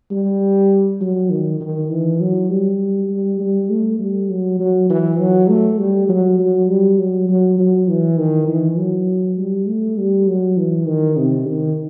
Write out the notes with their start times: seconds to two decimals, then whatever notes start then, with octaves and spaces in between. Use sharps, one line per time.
0.11 G3
1.00 F#3
1.30 D#3
1.60 D#3
1.90 E3
2.20 F#3
2.50 G3
3.10 G3
3.40 G3
3.70 A3
3.99 G3
4.30 F#3
4.59 F#3
4.89 E3
5.19 F#3
5.49 A3
5.79 G3
6.08 F#3
6.39 F#3
6.69 G3
6.98 F#3
7.29 F#3
7.58 F#3
7.88 E3
8.18 D#3
8.48 E3
8.78 F#3
9.37 G3
9.68 A3
9.98 G3
10.27 F#3
10.57 E3
10.87 D#3
11.17 C3
11.47 D#3